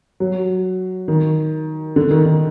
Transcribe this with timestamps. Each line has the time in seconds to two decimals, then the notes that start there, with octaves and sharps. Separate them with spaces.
0.20 F#3
1.08 D#3
1.96 D3
2.11 D#3
2.25 D#3